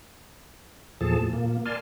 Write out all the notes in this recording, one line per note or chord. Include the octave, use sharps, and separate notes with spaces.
E2 A#2 F3 G#4 A4 A5
A2
A#2 A#3
A#4 D5 G#5 A5 C6 F6